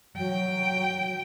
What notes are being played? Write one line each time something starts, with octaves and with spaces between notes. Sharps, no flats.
F#3 G5